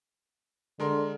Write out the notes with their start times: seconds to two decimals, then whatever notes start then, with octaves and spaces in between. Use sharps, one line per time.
0.80 D3 G#3 A#4 C6